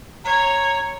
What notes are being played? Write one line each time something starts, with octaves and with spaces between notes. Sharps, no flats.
C#5 A#5